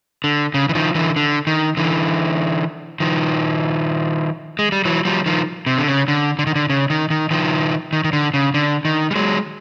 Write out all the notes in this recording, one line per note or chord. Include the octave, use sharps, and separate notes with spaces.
D3
C#3
E3
D#3 F3
D3 E3
D3
D#3
D3 E3
D#3 F3
G#3
G3
E3 F#3
F3 G3
D#3 F3
C3
D3
C#3
D3
D3
D#3
D3
C#3
D#3
D#3
D#3 F3
D#3
D#3
D3
C#3
D3
D#3
G3
F#3 G#3